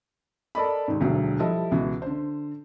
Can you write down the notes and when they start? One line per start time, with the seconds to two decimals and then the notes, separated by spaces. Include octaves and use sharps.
0.55 A4 A#4 D5 D#5 B5
0.88 D#2 G#2
1.01 E1 D2 G2 F#3
1.39 F3 G3 E4 A4 D#5
1.71 C#2 B2 E3
2.02 D3 C5